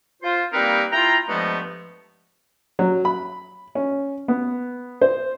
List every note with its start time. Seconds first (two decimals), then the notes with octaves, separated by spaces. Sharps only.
0.23 F4 C5
0.53 G3 A#3 C4 D#4 A#4 B4
0.93 E4 F4 G5 A#5
1.29 G2 F3 G#3 A3 B3
2.79 F#3
3.05 B5
3.75 C#4
4.28 B3
5.01 C5